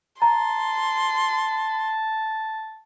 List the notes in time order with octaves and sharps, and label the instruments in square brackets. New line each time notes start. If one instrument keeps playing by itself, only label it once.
[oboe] A5 [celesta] A#5 [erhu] C6